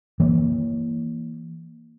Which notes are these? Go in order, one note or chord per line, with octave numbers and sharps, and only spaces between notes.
E3 A#3